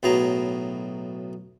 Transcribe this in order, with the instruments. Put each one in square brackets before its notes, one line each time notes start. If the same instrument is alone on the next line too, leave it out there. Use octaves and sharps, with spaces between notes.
[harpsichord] B1 A2 F#3 B3 G#4 A#5